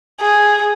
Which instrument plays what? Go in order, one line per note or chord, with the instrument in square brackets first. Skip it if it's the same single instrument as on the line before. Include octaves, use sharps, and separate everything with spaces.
[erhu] G#4